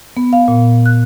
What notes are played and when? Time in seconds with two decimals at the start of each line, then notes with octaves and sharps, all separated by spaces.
0.17 B3
0.33 F5
0.48 A#2
0.86 F#6